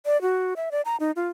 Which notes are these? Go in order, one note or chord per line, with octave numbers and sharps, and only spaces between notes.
D5
F#4
E5
D5
A#5
D#4
F4